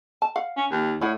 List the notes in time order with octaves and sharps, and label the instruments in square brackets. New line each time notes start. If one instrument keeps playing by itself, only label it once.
[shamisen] A5
F5 F#5
[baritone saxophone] C#4
D#2
[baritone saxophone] A2 [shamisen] E4 D5 F#5